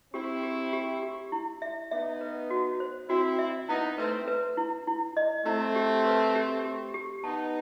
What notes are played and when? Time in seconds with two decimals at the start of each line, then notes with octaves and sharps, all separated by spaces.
0.14 C4 E4 G4
0.43 G4
0.73 G4
1.03 G4
1.32 E4
1.62 E5
1.91 B3 D#4 E5
2.21 B4
2.50 F#4
2.80 C5
3.09 C4 E4 F#4
3.39 E5
3.69 B3 D#4 E4
3.98 A3 C4 B4
4.28 B4
4.57 E4
4.87 E4
5.17 D#5
5.46 A3 C4 E4
5.76 G4
6.05 B4
6.35 G4
6.65 G4
6.94 G4
7.24 B3 D#4 A5